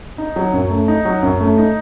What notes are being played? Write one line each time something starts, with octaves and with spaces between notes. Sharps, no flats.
D#4
F#3
F#2
A3
D#4
F#3
F#2
A3
D#4